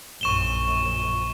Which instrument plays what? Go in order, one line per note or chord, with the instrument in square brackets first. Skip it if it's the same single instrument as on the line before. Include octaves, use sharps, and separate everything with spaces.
[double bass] A#1 F#2 [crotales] C#6 E7 G7